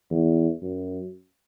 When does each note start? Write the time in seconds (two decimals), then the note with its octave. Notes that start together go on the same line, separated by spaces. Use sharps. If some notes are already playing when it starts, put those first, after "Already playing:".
0.10 E2
0.62 F#2